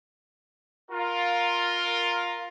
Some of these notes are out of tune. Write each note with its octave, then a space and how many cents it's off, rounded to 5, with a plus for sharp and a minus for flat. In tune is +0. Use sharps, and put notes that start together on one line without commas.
F4 +10 A#4 +0